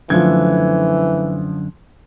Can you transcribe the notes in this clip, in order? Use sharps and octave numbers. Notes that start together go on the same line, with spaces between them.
F#2 D3 E3 F3 A3 G#6